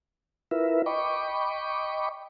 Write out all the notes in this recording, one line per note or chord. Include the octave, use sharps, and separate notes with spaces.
E4 F4 A#4 B4 E5
D#5 G5 B5 C#6 D6